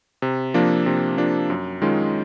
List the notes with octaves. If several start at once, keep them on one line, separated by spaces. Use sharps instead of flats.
C3
F3 A#3 D4
C3
F3 A#3 D4
F#2
D#3 G#3 C#4 F4